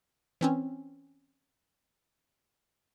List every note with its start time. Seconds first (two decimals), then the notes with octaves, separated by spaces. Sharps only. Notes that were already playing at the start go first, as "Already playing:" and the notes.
0.41 E3 C4 C#4